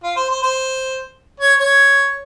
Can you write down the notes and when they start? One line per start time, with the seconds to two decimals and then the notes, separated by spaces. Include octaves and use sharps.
0.03 F4
0.16 C5
0.30 C5
0.43 C5
1.40 C#5
1.59 C#5